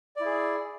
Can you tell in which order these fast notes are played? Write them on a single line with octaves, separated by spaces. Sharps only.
D5 E4 G#4